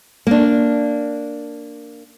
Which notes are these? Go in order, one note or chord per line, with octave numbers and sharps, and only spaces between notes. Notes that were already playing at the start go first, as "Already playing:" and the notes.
A#3 D4